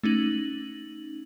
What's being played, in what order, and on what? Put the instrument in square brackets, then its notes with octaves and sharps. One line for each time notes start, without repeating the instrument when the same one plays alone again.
[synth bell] A3 C#4 D#4 F#7